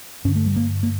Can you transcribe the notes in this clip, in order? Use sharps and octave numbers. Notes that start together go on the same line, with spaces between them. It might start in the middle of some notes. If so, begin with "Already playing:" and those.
G2 D3 C#4
A3
G3
A#3
A#3